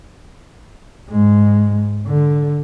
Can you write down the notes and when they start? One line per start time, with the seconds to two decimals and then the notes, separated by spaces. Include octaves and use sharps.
1.09 G#2 G#3
2.06 D3